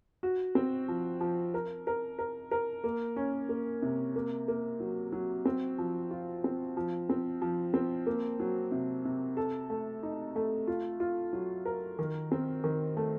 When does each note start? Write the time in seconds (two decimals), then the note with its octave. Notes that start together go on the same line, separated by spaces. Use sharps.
0.23 F#4
0.55 C4
0.88 F3
1.20 F3
1.54 A#4
1.87 A#4
2.19 A#4
2.51 A#4
2.84 A#3
3.16 C#4
3.49 A#3
3.82 C3
4.16 A#3
4.48 A#3
4.80 F#3
5.12 F#3
5.45 C4
5.78 F3
6.11 F4
6.44 C4
6.77 F3
7.09 C4
7.42 F3
7.74 C4
8.06 A#3
8.40 F#3
8.72 C3
9.05 C3
9.37 A4
9.70 A3
10.03 D#4
10.36 A3
10.67 F4
11.00 F4
11.33 F#3
11.65 A#4
11.99 D#3
12.32 C4
12.64 D#3
12.97 A3